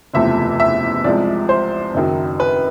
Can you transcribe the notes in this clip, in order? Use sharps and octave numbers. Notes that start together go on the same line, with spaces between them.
F#1 E2 C3 F3 A3 E5
E5
C2 C3 F3 G#3 D5
C5
F#1 F#2 D#3 F#3
B4